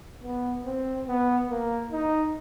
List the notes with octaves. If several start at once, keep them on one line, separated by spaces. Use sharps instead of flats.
B3
C4
B3
A#3
D#4